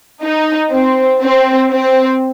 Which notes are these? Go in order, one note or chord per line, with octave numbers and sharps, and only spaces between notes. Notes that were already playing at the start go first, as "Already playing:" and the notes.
D#4
C4
C4
C4